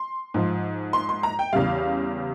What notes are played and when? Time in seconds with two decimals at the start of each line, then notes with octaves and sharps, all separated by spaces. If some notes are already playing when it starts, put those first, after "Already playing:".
Already playing: C6
0.34 G#2 F3
0.93 C6
1.09 C6
1.23 A#5
1.39 G5
1.53 E2 C#3 G3 F5